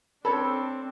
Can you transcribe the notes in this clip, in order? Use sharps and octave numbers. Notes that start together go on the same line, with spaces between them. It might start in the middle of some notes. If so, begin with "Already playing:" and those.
C4 D4 A4 C5 C#5 B5